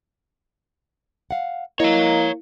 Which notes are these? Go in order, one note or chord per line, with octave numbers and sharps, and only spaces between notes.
F5 F#5
A#3 E4 C#5 D#5 A#5